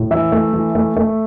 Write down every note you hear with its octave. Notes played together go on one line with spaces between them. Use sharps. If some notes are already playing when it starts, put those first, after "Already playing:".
Already playing: A2
E3 E5
A3
E3
A3
A3